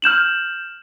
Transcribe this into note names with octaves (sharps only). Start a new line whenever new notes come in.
F6 G6 E7 F#7